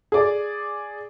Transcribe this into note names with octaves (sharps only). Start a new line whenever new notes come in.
G#4 D5